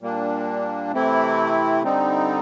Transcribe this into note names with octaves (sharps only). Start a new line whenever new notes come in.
A#2 G3 A#3 D4
C3 E3 A3 C4 E4
D3 G3 C4 D#4